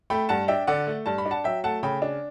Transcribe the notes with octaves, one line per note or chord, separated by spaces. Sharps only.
A3 G5 B5
G2 F#5 A5
D4 E5 G5
D3 D5 F#5
A3
G2 A5
B5
D4
F#5 A5
F#3 E5 G5
A3 F#5 A5
C#3 G5 B5
D4